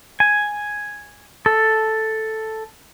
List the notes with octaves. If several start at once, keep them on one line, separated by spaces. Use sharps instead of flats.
G#5
A4